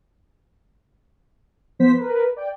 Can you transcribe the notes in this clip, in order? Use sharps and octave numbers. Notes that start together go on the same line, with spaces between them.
F3 B3 C5 B6
A#4 B4
D5 G5